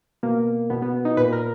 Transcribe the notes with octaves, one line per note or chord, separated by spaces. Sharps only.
B2 A#3
B2 B3
B3
D#4
A#2 B4
A#4